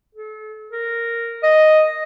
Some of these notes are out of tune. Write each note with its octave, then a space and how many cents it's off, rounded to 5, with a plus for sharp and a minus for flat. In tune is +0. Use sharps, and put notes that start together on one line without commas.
A4 -35
A#4 -5
D#5 +0